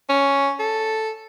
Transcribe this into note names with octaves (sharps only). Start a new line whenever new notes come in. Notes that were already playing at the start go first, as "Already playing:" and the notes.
C#4
A4